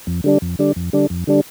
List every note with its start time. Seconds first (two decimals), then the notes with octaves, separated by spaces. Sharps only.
0.07 F2
0.24 D3 G3 D4
0.42 F2
0.59 D3 G3 D4
0.76 F2
0.93 D3 G3 D4
1.10 F2
1.27 D3 G3 D4